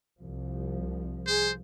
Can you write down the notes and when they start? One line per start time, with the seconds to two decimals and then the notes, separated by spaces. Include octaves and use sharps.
0.21 C2 F3
1.27 G#4 C5